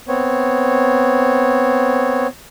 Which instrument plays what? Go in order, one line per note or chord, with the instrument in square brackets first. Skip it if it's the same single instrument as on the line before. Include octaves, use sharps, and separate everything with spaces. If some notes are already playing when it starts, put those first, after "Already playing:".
[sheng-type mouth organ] B3 C4 C#5